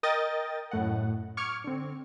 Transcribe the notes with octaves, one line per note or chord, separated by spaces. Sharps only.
A#4 D#5 G5 D#6 A6
F#2 A2 F#5
C#6 D6 F6 G#6 C#7
D3 C4